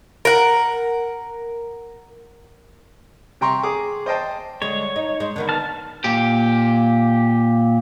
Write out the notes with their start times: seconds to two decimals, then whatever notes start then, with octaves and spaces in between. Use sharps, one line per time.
0.25 A#4 F#5
3.41 C3 G5 A#5 C6 C#6
3.63 G#4 D6
4.06 C5 D#5 G5 A5
4.62 D3 G#3 C#5
4.96 D#4
5.20 G#3 C5
5.36 D3 D#3 B3
5.49 A5 F6
6.04 A#2 G4